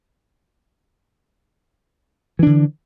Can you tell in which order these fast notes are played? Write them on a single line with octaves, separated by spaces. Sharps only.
E3 D4 D3